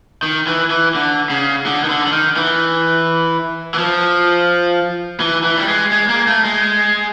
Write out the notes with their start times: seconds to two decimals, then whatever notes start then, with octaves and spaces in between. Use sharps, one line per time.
0.23 D#3
0.47 E3
0.70 E3
0.95 D3
1.30 C#3
1.66 D3
1.84 D#3
1.89 D3
2.06 D3
2.12 D#3
2.37 E3
3.74 E3
3.79 F3
5.20 E3
5.44 E3
5.57 G3
5.68 G#3
5.92 G#3
6.09 A#3
6.27 A3
6.44 G#3